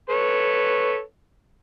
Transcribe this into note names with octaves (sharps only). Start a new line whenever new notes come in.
A4 B4 C#5